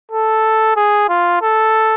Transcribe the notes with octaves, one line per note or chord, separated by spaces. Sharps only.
A4
G#4
F4
A4